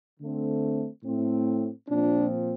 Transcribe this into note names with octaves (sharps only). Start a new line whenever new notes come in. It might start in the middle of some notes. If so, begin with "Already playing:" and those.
D3 A3 C4
A2 A3 C4
A#2 F3 C4 D4